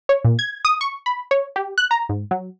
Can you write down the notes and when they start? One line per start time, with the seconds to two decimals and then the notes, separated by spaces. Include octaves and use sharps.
0.09 C#5
0.24 A#2
0.39 G#6
0.65 D#6
0.81 C#6
1.06 B5
1.31 C#5
1.56 G4
1.78 F#6
1.91 A#5
2.09 G#2
2.31 F#3